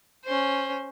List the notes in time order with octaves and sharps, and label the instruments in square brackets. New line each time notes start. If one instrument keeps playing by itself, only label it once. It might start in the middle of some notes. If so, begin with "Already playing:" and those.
[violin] C#4 C5